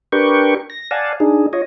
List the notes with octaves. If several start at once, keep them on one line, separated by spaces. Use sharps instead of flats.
D4 G4 A#4 B4 G5 C#6
A#6
D5 F5 F#5 G#5 A5
D4 D#4 G#4
F4 C#5 D#5